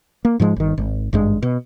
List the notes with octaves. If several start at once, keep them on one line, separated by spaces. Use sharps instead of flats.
A#3
G#2 F3 G#3
G1 D#3
G#1
G#1 G2 G#3
B2